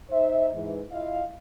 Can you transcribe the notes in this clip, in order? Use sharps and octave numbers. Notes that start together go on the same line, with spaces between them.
D#4 C5 E5
G#2 E3
E4 F4 D#5 F5